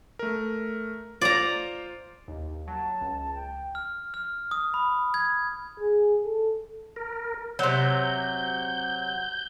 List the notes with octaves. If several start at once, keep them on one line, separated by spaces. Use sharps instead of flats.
A3 A#4
F4 C5 D5 A#5
D#2
F#3 A5
C#2
G5
F6
F6
D#6
B5
G#6
G#4
A4
A#4
C3 F#3 G6